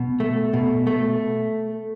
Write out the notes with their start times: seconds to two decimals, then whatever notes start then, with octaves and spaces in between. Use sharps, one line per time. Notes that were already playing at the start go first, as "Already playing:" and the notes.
Already playing: B2
0.20 A3
0.53 B2
0.87 A3